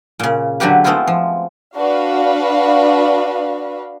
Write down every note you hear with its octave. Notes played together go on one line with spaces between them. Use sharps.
A#2 C#3
D3 F#3 F#4 G4 B4
G#3 A3 B3 C4 E4 F4
F3
D4 F#4 B4 F5